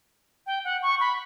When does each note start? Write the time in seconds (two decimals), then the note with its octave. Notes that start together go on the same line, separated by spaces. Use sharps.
0.46 G5
0.64 F#5
0.82 C#6
1.00 B5